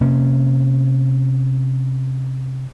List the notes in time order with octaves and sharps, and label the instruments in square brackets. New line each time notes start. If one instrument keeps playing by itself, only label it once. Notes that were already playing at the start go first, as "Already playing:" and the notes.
[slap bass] C3 A#3 C#4